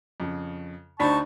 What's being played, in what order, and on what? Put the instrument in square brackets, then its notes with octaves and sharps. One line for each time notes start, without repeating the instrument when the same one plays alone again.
[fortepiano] F2 C#3
[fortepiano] D2 D#4 C5 [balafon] D4 D5 B5 [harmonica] A5 C#6